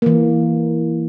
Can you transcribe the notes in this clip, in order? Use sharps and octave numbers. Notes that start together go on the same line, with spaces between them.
E3 A#3